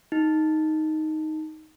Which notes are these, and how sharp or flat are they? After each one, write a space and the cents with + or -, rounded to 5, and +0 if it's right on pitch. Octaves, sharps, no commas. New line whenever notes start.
D#4 +5